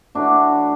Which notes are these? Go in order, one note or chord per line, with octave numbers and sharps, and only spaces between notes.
A2 E3 D4 F#4